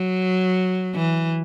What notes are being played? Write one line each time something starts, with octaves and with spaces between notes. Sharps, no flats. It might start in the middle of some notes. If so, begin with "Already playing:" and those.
Already playing: F#3
E3